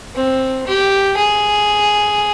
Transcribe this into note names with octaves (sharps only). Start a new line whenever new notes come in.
C4
G4
G#4